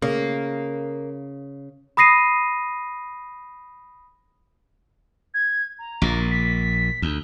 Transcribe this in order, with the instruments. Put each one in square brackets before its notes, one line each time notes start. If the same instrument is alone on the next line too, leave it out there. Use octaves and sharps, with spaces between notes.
[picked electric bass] C#3 [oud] A#3
[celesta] B5 D#6 A#6 C7 D#7
[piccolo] G#6
A#5
[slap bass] A#1 A#2
[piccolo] B6
[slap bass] D2